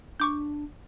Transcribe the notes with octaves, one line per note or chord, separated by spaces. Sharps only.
D4 C#6 D6 G6